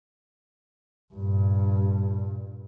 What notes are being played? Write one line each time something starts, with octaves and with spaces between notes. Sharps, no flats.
G2 A#2